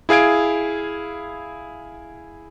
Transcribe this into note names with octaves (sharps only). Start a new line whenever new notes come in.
E4 G#4 F5 G#6 D7